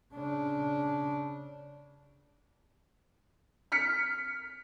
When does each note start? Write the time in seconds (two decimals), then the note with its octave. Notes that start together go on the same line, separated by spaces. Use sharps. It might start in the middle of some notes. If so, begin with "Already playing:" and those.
0.14 C#3 D4
3.72 F6 B6 C#7